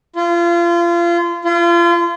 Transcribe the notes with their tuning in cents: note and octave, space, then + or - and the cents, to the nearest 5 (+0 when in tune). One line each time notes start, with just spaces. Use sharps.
F4 -30
F4 -35